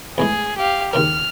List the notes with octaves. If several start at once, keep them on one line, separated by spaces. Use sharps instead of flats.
E2 A2 G#3 G#4
G4 F5
D#2 C#3 A#4 F6